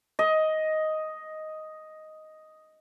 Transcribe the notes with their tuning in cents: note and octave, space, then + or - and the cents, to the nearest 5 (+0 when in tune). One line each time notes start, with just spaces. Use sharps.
D#5 +5